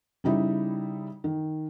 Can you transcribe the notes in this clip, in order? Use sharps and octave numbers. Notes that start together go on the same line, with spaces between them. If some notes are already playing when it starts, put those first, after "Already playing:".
C#3 G3 D#4 E4
D#3